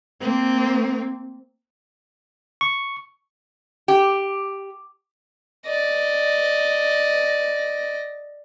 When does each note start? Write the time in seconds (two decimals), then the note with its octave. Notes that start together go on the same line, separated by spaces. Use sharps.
0.21 A#3 C4
2.61 C#6
3.88 G4
5.66 D5 D#5